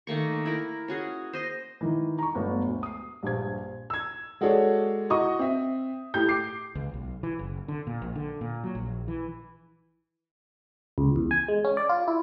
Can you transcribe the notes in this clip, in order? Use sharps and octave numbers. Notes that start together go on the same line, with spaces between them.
D#3 A3 A#3 C#6
E4 A#4
C#4 F#4 G#4
C5 D#5
D#3 E3
A#5 C#6
G1 F#3 A3 B3
D2
D#6 C7
A#1 G2 C5 G#6
E6 G#6
G#3 F#4 G#4 A4 C#5 D5
E4 F#4 D#5 C#6 D#6
C4 E5
A2 G4 G6
D6 C7
C#2
B1
E3
F#1
D3
A#2
A#1
D3
A#2
F#3
A#1
E3
C#2
E2
G#5
G#3
C#4
D5
F4
E4